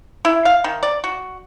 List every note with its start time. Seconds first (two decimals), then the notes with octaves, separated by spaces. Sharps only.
0.25 E4
0.45 F5
0.64 D#3
0.83 D5
1.04 F#4